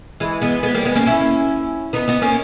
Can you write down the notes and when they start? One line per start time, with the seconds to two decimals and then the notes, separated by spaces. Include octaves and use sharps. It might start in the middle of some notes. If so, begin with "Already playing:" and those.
0.20 E3 G#3
0.41 G#3 B3
0.63 G#3 B3
0.75 G3 A#3
0.85 G#3 B3
0.96 A#3 C#4
1.06 C#4 E4
1.93 B3 D#4
2.08 B3 D#4
2.22 A#3 C#4